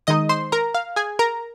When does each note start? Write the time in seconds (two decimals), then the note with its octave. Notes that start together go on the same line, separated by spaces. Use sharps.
0.07 D#3 G#3 D#4 D#5 D#6
0.29 C5 C6
0.52 A#4 A#5
0.75 F5
0.96 G#4 G#5
1.19 A#4 A#5